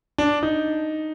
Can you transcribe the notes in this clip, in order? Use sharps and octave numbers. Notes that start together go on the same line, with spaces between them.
D4
D#4